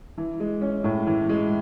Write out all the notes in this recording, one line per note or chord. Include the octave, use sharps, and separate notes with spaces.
E3
G#3
C#4
A2
E3
G#3